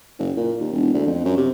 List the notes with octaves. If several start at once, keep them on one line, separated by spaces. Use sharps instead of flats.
F#1
A#2
D#2
E1
D2
F2
F#2
C3